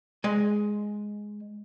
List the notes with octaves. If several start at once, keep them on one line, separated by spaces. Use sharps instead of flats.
G#3 G#5